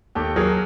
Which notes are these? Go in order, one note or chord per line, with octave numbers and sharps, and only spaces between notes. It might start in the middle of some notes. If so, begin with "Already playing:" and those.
D#2 G4 A4
F#3 G#4 A#4